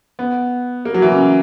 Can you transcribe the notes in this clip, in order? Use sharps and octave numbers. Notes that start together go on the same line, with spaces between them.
B3
A#3
F#3
E3
C#3